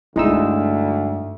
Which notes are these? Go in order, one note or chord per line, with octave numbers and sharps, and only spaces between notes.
D2 G2 G#3 A3 D#4 E4 E6